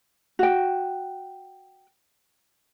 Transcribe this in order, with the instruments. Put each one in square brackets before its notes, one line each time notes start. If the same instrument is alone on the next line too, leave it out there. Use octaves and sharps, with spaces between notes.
[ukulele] F#4 G5